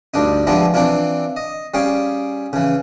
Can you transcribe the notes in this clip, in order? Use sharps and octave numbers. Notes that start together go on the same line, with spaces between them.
D2 G2 D4 D#4
F3 G3 G#3 B3 D4 E4
E3 C4 D4 E4 F4
D#5
G3 C#4 G#4 F5 G5
C#3 E3